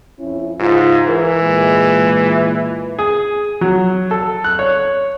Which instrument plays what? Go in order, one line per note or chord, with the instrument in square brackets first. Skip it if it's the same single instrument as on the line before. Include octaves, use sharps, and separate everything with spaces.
[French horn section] F2 C#4 E4
[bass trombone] G#2 [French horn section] C#3 F4
[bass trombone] E3 [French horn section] A#4
[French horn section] A#2 G#3
[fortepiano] G#4
F#3
A4
F#6
C#5